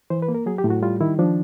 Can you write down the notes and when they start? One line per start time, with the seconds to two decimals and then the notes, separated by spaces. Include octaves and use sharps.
0.10 E3 C5
0.22 B4
0.28 A#3
0.34 A#4
0.46 F#3 G#4
0.58 G4
0.64 A2
0.70 F#4
0.82 G3 F4
1.01 D#3 E4
1.19 F3 D4